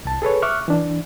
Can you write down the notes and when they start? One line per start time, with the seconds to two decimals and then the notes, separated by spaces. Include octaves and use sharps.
0.05 C2 A5
0.22 G#4 A4 B4 C#5
0.42 E5 C#6 D6 F6 F#6
0.68 E3 D4